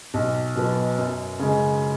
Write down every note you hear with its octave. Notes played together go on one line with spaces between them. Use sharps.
B1
B2 F#3 B3
F#2
C#3 G#3